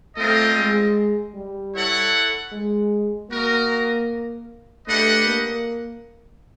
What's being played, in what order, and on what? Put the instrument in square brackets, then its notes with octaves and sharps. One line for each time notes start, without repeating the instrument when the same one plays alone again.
[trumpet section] G3 C4 F4 A#4 D#5 [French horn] A3
[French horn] G#3
G3
[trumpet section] E4 A4 C#5 F#5
[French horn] G#3
[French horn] A#3 [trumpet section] F#4 A#4 D#5
[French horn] A3 [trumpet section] D4 G4 B4 D#5 F#5
[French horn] A#3